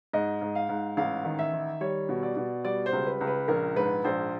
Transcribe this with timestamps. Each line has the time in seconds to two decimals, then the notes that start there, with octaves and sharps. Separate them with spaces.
0.13 G#2 D#5
0.42 G#2
0.55 F5
0.69 G#2
0.97 A1 F5
1.25 D#3
1.39 E5
1.53 D#3
1.81 G3 C#5
2.09 B2
2.23 D5
2.37 B2
2.64 G3 D5
2.86 C5
2.92 C#2
3.06 B4
3.21 C#2
3.27 B4
3.48 A#1 A#4
3.76 G#2 B4
4.04 A#1 C5